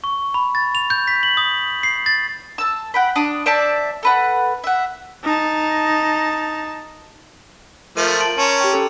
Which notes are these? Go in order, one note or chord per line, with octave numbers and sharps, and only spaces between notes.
C#6
B5
A6
F7
G6
B6
F#7
D#6
C7
A6
A5 E6
F#5 G5 B5
D4 D#6
C5 D5 E5 A5
A4 B4 F#5
E5 F#5
D#4 A5
F3 A3 A#4 D#7
C6 A6
A5 D7 F#7
C#4 A5 A#5
G4 G5
C#4 A4